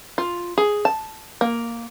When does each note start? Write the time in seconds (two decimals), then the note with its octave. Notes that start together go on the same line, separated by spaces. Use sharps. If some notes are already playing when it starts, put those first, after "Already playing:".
0.18 F4
0.58 G#4
0.85 A5
1.41 A#3